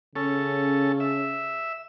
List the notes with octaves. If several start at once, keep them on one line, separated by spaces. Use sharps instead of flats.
C#3 C#4 A4
E5